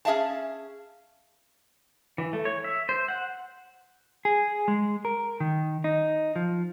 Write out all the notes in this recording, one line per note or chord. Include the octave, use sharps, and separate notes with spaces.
C#4 G#4 E5 F5 A5
E3
A3
C#5
E5
C5
F#5
G#4
G#3
A#4
D#3
D#4
F3